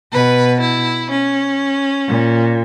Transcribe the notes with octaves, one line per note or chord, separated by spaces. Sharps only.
B2 B4
E4
C#4
A#2